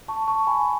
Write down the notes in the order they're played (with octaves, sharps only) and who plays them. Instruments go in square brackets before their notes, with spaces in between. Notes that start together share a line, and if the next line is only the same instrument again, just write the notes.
[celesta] A5 C#6
A5 C#6
G#5 B5